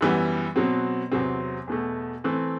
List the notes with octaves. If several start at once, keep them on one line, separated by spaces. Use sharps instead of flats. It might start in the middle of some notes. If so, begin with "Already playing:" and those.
F#2 E3 G3 B3
B2 F#3 C4
E2 C3 F#3 C4
E2 B2 A3
E3 A3 C4